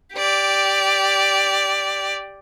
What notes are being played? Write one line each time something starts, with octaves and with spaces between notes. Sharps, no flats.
G4 D5